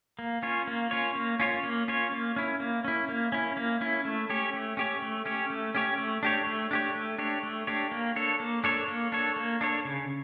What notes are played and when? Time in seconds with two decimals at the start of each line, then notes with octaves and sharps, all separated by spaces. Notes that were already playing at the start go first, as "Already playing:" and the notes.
0.19 A#3
0.43 C#4 F4 C#5
0.67 A#3
0.91 C#4 F4 C#5
1.15 A#3
1.40 C#4 F4 C#5
1.64 A#3
1.88 C#4 F4 C#5
2.12 A#3
2.36 C#4 E4
2.60 A#3
2.85 C#4 E4
3.09 A#3
3.32 C#4 E4
3.57 A#3
3.81 C#4 E4
4.05 A3
4.30 C#4 G4 C#5
4.54 A3
4.77 C#4 G4 C#5
5.02 A3
5.26 C#4 G4 C#5
5.50 A3
5.75 C#4 G4 C#5
5.98 A3
6.23 D4 G4 C#5
6.47 A3
6.71 D4 G4 C#5
6.95 A3
7.19 D4 G4 C#5
7.43 A3
7.67 D4 G4 C#5
7.92 A#3
8.16 D4 A4 C#5
8.40 A#3
8.64 D4 A4 C#5
8.88 A#3
9.12 D4 A4 C#5
9.36 A#3
9.61 D4 A4 C#5
9.85 C#3